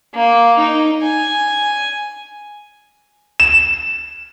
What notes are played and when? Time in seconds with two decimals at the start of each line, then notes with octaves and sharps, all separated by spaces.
0.14 A#3
0.58 D#4
1.02 G#5
3.40 E7